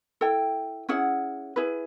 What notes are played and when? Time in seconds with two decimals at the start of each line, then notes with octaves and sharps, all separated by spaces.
0.21 E4 A4 G5
0.89 C#4 E4 G#4 F#5
1.56 E4 G#4 B4